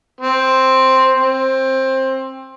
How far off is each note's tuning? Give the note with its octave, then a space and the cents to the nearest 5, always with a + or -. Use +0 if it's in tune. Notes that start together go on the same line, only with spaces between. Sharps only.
C4 +5
C4 +20